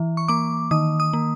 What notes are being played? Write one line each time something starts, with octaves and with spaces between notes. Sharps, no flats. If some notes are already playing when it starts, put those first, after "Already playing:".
Already playing: E3
C#6
A#3 D6
D#3 D#6
D#6
A#3